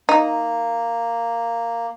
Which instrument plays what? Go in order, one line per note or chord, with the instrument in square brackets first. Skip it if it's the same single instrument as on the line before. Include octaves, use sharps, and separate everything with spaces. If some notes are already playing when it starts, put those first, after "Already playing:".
[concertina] A#3 [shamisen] D#4